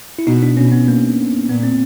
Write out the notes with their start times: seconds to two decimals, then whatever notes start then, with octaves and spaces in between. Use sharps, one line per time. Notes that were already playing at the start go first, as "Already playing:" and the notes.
0.19 E4
0.27 B2 D#4
0.43 D4
0.57 B2 C#4
0.72 B3
0.88 A#3
1.49 A#2 B3
1.63 C4